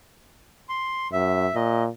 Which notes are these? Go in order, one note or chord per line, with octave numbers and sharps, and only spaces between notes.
C6
F#2 E5
A#2 D#5